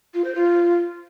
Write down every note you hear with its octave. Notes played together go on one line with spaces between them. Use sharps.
F4
C5
F4